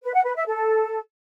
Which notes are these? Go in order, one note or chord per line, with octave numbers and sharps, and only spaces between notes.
B4
F#5
B4
E5
A4